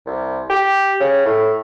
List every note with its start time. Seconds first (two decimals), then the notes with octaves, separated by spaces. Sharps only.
0.06 C2
0.50 G4
1.00 C#3
1.25 A2